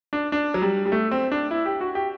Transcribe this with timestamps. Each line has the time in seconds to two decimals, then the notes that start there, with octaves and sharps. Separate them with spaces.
0.13 D4
0.32 D4
0.54 F#3
0.62 G3
0.86 G3
0.92 A3
1.11 C4
1.32 D4
1.51 E4
1.66 G4
1.81 F#4
1.95 G4